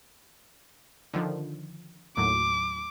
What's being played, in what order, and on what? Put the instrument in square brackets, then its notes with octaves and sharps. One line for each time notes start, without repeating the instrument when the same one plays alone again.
[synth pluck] D3 D#3 F3
[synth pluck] D#2 A2 F#3 [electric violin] D6